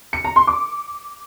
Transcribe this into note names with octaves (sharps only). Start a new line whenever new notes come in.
C#7
A#5
C6
D6